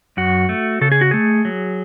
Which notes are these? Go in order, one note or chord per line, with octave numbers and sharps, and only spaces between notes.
F#2 F#4
A3
C#3 A4
G#4
F#4
A3 G#4
F#3